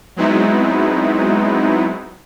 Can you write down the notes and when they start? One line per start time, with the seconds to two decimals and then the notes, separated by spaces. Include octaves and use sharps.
0.16 F#3 G#3 B3 C4 D#4 E4